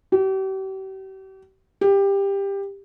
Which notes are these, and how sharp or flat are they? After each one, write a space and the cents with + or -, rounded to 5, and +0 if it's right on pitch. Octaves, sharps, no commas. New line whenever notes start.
G4 -40
G4 +15